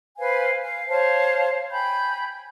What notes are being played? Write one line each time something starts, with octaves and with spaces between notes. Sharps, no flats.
B4 C5 F5 G#5
F5
C5 C#5 F5 A5
G5 G#5 B5 G6